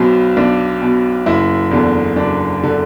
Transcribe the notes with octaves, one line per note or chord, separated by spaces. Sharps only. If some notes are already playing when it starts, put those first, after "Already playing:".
Already playing: B1 B2 C4
B1 D4
B2
F#1 E4
E2 D3
F#1 D4
D3